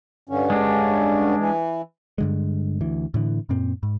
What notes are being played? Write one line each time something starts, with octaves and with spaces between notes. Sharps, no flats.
G2 D3 C#4
G#3 D4
E3
G2 D3 G#3
D2 E3
A2 D3 E3
F#2 A#2 C4
G#2